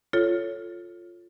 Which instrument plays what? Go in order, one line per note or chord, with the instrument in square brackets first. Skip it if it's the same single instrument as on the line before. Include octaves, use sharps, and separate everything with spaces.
[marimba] F4 A4 C#5